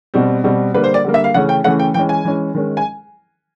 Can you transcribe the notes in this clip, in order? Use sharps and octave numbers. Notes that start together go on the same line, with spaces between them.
B2 G3 C4
B2 G3 C4
D3 G3 A#3 B4
C5
D5
D3 G3 A#3
E5
F5
C#3 E3 A3 C#4 F#5
G5
C#3 E3 A3 C#4 F#5
G5
E3 G#3 C#4 G5
G#5
E3 G#3 C#4
D#3 G#3 C#4
G#5